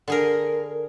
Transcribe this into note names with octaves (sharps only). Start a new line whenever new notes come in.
D3 G#4 A#4